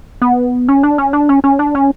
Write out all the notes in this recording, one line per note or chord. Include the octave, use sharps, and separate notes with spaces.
B3
C#4
D4
C#4
D4
C#4
C#4
D4
C#4